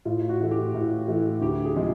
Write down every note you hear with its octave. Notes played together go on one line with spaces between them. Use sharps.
A2 F4
F#4
E3 A3
G4
A2
E3 A3
D2 G4
G#4
C3 F3 G#3